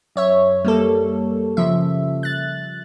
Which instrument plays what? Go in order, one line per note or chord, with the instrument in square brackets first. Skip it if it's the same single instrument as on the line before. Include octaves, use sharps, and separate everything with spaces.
[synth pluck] F#2 C#5 E5
G3 A#3 A4
C#3 F3 E5
F#6 A6